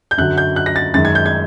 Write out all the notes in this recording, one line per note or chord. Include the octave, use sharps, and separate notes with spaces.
G6
F#2 D3 F#3 F#6
G6
F#6
A#6
A6
F#2 D#3 G#3 A6
G#6
G6
G#6